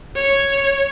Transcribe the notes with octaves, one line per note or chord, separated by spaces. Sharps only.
C#5